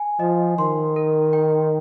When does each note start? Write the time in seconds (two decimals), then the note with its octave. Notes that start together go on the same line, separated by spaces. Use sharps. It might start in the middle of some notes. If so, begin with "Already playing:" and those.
Already playing: G#5
0.19 F3 D#5
0.58 D#3 C6
0.96 A#4
1.33 G5